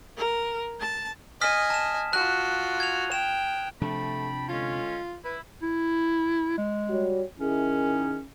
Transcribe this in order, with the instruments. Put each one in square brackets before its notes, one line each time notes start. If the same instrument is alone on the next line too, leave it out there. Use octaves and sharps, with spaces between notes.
[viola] A#4
A5
[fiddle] D#5 G#5 [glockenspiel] D#6 F6 B6
[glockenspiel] A5 E7
[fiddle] F4 F#4 [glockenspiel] F#6
[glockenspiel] G#6 F7
[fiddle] G5 [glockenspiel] E7
[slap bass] C3 F3 D4 [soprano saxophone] A3 [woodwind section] G5 A5 B5
[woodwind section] D3 G#3 C#4 [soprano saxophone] F4
[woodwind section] E4 [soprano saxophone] B4
[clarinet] E4
G#3
[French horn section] G3 F#4 C#5
[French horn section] D#3 E4 G#4 [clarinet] C#4